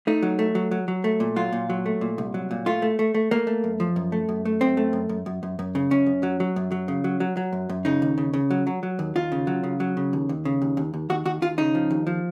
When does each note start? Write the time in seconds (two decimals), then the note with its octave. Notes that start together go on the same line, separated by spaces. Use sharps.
0.07 A3 D#4
0.23 F#3
0.39 A3
0.55 F#3
0.71 F#3
0.88 F#3
1.04 A3
1.20 A#2
1.36 F#3 F4
1.53 A#2
1.70 F#3
1.86 A3
2.01 A#2
2.18 C2
2.34 F#3
2.51 A#2
2.66 A3 F4
2.82 A3
2.99 A3
3.14 A3
3.31 A3 A#3
3.47 A3
3.64 F#2
3.80 F3
3.96 F#2
4.12 A3
4.29 F#2
4.45 A3
4.61 F#2 C4
4.77 A3
4.93 F#2
5.09 F#2
5.26 F#2
5.43 F#2
5.59 F#2
5.75 C#3
5.91 F#2 C#4
6.06 F#2
6.23 F#3
6.40 F#3
6.56 F#2
6.72 F#3
6.88 C#3
7.04 F#3
7.20 F#3
7.37 F#3
7.53 F#2
7.69 F#2
7.85 C#3 D#4
8.02 D#2
8.18 C#3
8.34 C#3
8.51 F#3
8.67 F#3
8.83 F#3
8.99 D#2
9.16 D#2 F4
9.32 C#3
9.47 F#3
9.63 C#3
9.80 F#3
9.97 C#3
10.13 D#2
10.29 D#2
10.45 C#3
10.62 D#2
10.77 D#2
10.94 D#2
11.10 D#2 F#4
11.25 D#2 F#4
11.42 D#2 F4
11.58 C#3 D#4
11.75 F3
11.91 D#2
12.07 F3